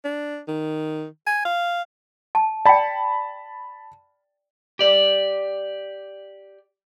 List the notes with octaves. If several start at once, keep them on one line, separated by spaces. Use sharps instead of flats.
D4
D#3
G#5
F5
A5
D5 G5 A5 B5
G4 D5